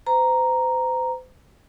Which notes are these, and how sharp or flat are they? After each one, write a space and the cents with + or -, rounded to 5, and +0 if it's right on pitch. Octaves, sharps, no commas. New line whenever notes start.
C5 -40 A#5 +0